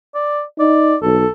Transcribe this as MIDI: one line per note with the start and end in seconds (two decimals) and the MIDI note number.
0.15 0.43 74
0.59 0.97 63
0.59 0.96 74
1.02 1.25 35
1.02 1.30 69